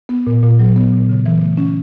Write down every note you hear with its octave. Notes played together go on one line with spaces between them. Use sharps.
B3
A#2
A#2
F#3
B3
A#2
C#3
E3
A3
C#4